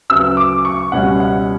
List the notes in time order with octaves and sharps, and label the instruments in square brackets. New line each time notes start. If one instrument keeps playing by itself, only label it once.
[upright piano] D2 C#3 F#3 B3 E6
D6
C#6
C#2 B2 G3 C#4 F#5
F#5